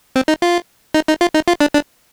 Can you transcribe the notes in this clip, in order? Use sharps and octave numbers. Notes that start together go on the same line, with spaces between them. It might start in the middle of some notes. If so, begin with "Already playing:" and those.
C4
D#4
F4
D#4
D#4
F4
D#4
F4
D4
D4